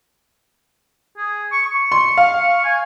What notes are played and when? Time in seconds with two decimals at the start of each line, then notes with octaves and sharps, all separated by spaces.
1.17 G#4
1.52 C#6
1.65 C#6
1.92 C6
2.17 F5
2.65 G#5